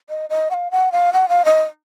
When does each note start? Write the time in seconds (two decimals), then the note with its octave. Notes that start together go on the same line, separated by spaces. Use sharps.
0.09 D#5
0.30 D#5
0.51 F#5
0.54 F5
0.71 F#5
0.92 F5
1.13 F#5
1.29 F5
1.45 D#5